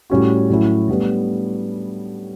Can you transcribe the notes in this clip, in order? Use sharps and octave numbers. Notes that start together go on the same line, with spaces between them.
A2 G3 C#4 F#4
A2 F#3 C#4 E4
A2 G3 B3 D4